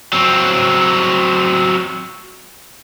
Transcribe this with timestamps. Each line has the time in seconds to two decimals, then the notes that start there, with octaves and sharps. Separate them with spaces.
0.13 F#3 C4